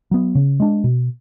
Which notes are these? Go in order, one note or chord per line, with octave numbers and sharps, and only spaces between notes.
F#3 B3
C#3
G#3 D4
B2